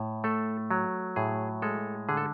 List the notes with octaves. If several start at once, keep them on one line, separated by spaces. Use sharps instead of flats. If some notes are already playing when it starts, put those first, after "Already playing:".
Already playing: A2
A3 A4
F#3
A2 G#4
G#3 A4
D3 G#4
A4